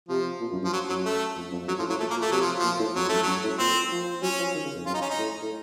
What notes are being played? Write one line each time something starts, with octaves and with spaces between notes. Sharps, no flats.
C3 F3
A#2
F#2
F#2 F3
F#3
F#2 F#3
A3
F2
F2
F#2 F#3
A2 F3
A2 F#3
A#2 A3
A#3
A#2
A3
C3 F#3
F3
A#2 F3
A2
F2 F#3
F#2 A3
F#2 F#3
A2
A#2 C4
F3
F#3 C#4
F3
D#3
C#3
F2
F#2 F4
D#4
C#4
D#4
A2
A2